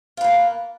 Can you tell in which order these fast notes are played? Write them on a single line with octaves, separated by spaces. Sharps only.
F4 B4 A#3